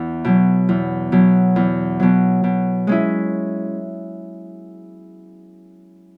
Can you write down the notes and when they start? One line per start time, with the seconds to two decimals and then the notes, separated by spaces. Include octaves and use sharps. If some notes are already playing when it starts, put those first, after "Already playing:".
Already playing: E2
0.25 B2 F#3
0.69 E2
1.12 B2 F#3
1.56 E2
2.00 B2 F#3
2.44 B2
2.87 G#3 C#4 E4